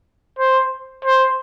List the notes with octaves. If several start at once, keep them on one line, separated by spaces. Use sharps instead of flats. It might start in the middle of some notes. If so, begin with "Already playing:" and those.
C5
C5